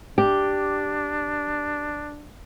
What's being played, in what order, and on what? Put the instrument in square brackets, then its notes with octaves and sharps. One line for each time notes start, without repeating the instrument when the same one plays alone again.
[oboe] D4 [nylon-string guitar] G4